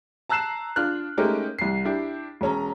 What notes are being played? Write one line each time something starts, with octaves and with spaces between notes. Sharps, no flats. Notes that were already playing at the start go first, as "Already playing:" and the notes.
A5 A#5 E6 F#6 C7 E7
D4 F4 F6 F#6
G#3 A3 C#4 D#4 G4 A#4
C2 C7
D4 E4 G4
E1 C#4 A#5